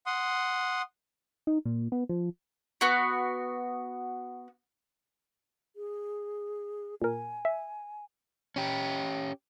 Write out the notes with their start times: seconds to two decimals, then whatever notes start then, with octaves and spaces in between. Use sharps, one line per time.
0.06 F#5 C6 D#6
1.47 D#4
1.65 A#2
1.92 B3
2.09 F3
2.81 B3 F#4
5.76 G#4
7.02 A#2 A#4 G#5
7.45 E5
8.56 C#4 G4